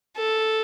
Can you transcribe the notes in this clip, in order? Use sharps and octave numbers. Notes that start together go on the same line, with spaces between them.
A4